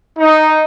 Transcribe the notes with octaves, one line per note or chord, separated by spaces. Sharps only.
D#4